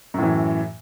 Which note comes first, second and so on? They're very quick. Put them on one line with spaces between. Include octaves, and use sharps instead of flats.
F#2 A2 E3